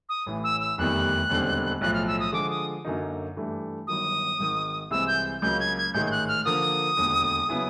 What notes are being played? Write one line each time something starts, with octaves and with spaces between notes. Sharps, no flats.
D#6
A1 A2 E3
E6
E6
F1 E2 C3 D#3 G3 F#6
E1 D#2 D3 G3 C4
B1 A2 F3 F#6
F6
E6
D#6
D3 F3 G#3 D6
D#6
F#2 D3 F#3 A#3 D#4
G2 E3 A3 D4 G4
G1 G2 D#3 F#3 D#6
G#1 G#2 D#3
C2 C3 E3 G#3 C4 E6
G6
C#2 C#3 F#3 A#3 G6
G#6
G#6
A1 G#2 D#3 G#3 G6
G6
F#6
F6
D3 F3 A#3 D#6
E1 D#2 D3
C#3 F#3 B3 E4 G#4